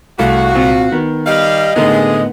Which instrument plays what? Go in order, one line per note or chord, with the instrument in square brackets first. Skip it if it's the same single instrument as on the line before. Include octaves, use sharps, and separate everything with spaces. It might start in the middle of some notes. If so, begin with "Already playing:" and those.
[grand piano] C2 [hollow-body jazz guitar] A3 [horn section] F#4 [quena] F5
[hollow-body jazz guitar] A#2 C4 F4
[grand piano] D#3 [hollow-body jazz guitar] B3
[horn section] G3 F5 [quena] D#5
[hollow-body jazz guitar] A2 A#3 B3 [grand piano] D3 D#4 [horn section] G#3 G#4